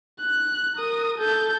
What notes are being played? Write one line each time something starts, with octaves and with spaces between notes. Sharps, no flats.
F#6
A#4 D#6
A4 G6